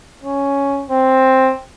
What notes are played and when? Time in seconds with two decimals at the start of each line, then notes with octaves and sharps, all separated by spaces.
0.23 C#4
0.90 C4